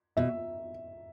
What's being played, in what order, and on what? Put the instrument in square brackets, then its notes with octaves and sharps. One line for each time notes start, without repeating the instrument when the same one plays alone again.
[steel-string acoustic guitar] B2 [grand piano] E5